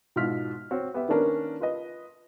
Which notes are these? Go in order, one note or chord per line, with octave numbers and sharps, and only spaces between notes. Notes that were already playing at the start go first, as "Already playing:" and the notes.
G#2 B2 E4 F4 F6 B6
C4 F#4 C#5
B3 G4 E5
D#3 A#3 C#4 D4 A#4 B4
F4 B4 D#5